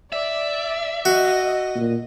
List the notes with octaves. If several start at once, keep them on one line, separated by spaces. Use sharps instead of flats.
D5 E5
F#4 D#5
A#2